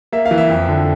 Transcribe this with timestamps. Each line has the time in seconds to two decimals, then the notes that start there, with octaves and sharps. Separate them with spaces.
0.12 A#3 E5
0.26 F5
0.31 E3
0.38 E5
0.50 F2
0.68 D3